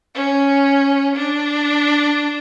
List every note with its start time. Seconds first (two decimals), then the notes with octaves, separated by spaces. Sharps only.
0.15 C#4
1.16 D4